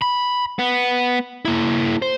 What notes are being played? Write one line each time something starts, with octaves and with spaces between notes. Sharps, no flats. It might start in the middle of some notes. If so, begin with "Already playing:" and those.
B5
B3
A#3 E4
C5